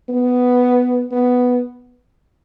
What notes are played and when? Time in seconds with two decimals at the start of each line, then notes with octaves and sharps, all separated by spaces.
0.09 B3
1.11 B3